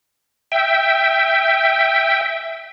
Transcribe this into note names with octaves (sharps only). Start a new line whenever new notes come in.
E5 G5